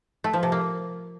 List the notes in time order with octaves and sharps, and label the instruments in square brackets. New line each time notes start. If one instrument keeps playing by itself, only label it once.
[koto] A3
F3
C3
A#3